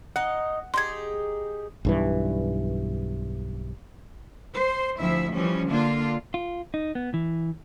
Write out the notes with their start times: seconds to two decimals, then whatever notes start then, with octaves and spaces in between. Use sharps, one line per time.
0.16 D#4 D#5 F#5
0.74 D#4 G4 G#4 C6 G#6
1.85 B1 G2 E3
4.54 C5
4.99 D2 F3 E4 E5
5.31 E3 F3 G3 C#4
5.68 D3 A#3 D4 F4
6.34 F4
6.74 D#4
6.95 B3
7.14 E3